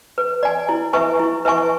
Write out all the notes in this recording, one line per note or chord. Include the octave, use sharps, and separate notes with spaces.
B4
D5 G#5
E4
B4 E5 G#5 C#6
E4
B4 E5 G#5 C#6